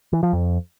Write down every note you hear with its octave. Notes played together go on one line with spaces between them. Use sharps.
E3
F3
F2